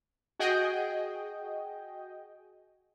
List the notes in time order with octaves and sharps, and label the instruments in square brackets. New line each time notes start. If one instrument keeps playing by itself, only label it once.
[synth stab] F#4 G#4 D#5 G5